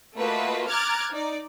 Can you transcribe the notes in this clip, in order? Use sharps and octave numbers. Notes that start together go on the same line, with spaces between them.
A3 A#3 F4 F#4 B4 D#5
A#5 D6 F6 F#6 G#6 A6
D#4 D5